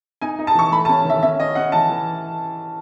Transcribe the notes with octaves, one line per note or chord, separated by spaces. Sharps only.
D#4 G#5
D#4
A5
E3 C#6
A3 B5
A5
C#4
D#3 E5
C#4 E5
C#4 D#5
C#4 F#5
E3 A5
E3